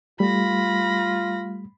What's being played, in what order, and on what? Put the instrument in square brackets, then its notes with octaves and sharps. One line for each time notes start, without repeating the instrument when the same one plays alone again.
[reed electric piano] G3 A3 [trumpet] F4 [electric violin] B5 A#6